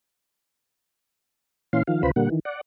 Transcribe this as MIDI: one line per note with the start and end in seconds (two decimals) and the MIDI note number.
1.73 1.83 46
1.73 1.83 52
1.73 1.83 61
1.73 1.83 77
1.73 1.83 84
1.87 2.02 51
1.87 2.02 53
1.87 2.02 77
2.03 2.11 38
2.03 2.11 49
2.03 2.11 65
2.03 2.11 71
2.03 2.11 72
2.03 2.11 83
2.16 2.29 46
2.16 2.29 50
2.16 2.29 55
2.16 2.29 58
2.16 2.29 78
2.30 2.39 51
2.30 2.39 52
2.45 2.61 74
2.45 2.61 78